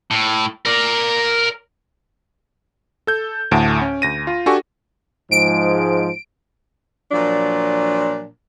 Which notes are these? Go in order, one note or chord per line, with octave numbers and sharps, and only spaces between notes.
A2
A#4 D5
A4 G6
D2 A2 F#5 A5 D7
C#4
D2 A#6 D#7
F4
D4 F#4 G4 A4 G#5 C#6
G#2 F3 G#3 D7
A#2 F3 F#3 D4